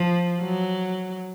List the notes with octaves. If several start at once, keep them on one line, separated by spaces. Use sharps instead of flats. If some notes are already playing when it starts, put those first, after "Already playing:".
Already playing: F3
F#3